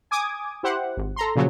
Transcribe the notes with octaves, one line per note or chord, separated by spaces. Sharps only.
G#5 D6 D#6 G#6
E4 G4 C5 F#5
G#1
A4 A#5 C6
A#2 C#3 F3 F#3